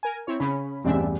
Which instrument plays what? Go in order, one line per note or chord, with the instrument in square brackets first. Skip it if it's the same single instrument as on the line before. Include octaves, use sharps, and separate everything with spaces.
[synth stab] A#4 G#5
C4 E4 C#5
[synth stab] C#3 C#4 [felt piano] B5
[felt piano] A1 E2 G2 [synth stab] C4 D4 E5